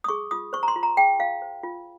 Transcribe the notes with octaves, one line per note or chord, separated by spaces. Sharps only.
D#6
G#4 C#6
F4 D#6
C5 C#6
A#5
C6
F4
A#5
G#4 G5
F4 F5
C5
F4